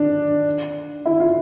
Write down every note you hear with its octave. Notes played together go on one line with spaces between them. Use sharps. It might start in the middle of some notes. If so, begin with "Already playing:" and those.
Already playing: D4
E4
F4